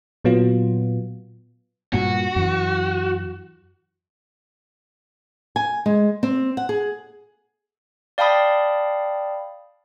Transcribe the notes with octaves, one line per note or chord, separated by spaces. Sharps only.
A#2 F#3 B3 F4
G2 A#2 F#4
F#2 E3
G#5
G#3
C4
F#5
G#4
D5 F5 G5 A5 B5 D#6